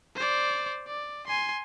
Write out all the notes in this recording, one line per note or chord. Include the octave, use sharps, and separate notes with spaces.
C5 D5
D5
G#5 C6